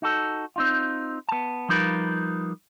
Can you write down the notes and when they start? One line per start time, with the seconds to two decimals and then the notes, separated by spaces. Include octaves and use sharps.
0.02 D#4 F#4 A4
0.56 C4 D#4 F4
1.29 B3 A5
1.69 F3 G3 D#4 F4 A#4 B4